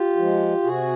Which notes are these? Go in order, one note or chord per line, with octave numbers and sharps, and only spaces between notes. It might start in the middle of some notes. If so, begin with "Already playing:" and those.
Already playing: F4 G4
F3 G#3
C3 F#4 G#4